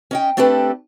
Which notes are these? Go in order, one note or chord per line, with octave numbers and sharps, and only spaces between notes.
C#4 D#5 G5
A3 C4 D4 G4 A4 B4